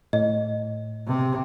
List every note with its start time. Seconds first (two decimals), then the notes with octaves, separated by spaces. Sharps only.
0.13 A2 D#5
1.07 C3